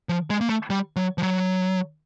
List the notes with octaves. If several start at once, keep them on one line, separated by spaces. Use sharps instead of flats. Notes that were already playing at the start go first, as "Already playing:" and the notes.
F3
G#3
A#3
A3
G3
F#3
F3
F#3